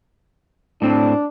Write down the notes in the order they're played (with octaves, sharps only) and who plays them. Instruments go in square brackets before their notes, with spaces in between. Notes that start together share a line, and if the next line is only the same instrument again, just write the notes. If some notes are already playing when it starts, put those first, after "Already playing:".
[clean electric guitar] A2 C4 [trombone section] D4